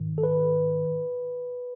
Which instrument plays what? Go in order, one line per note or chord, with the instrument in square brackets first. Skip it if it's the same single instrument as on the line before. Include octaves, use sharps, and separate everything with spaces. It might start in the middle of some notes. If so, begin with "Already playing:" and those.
Already playing: [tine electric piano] G#2 D#3
A4
B4